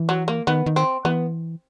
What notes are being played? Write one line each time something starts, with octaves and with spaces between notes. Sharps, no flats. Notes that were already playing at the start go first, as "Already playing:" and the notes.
Already playing: E3
F#3
A#3
D#3 B3
D#3
C4
E3 B3